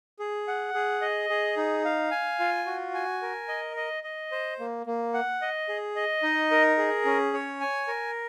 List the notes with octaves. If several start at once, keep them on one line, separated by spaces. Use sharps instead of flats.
G#4
F#5
G#4
D#5
G#4
D#4
F5
G#5
F4
F#4
G#5
A#4
D#5
D#5
D#5
C5
A#3
A#3
F#5
D#5
G#4
D#5
D#4
A#4
G#4
C#4
C#5
G#5
A#4